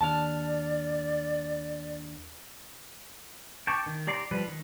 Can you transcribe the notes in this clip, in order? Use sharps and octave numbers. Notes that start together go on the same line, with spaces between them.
D#2 D4 D5 A5 F6
G5 A5 C#6 D6
D#3
G4 D5 A#5 C6 D6
F3 G3 B4
D#3